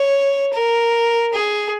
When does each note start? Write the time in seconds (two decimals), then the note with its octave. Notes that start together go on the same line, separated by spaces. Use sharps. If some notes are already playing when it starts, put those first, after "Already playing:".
Already playing: C#5
0.53 A#4
1.33 G#4